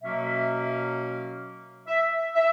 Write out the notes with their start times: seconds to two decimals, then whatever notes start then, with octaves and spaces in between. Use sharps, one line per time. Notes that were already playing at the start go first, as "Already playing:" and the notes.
0.02 B2 F#3 A#3 C#4 E5
1.88 E5
2.35 E5